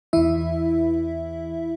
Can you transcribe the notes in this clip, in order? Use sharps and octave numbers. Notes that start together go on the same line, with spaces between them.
E2 E3 E4 E5